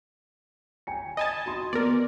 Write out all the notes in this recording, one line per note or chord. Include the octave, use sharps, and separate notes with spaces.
G5 G#5 C#7
D#5 G#5 A5 B5
F#4 C6
B3 A#4 D5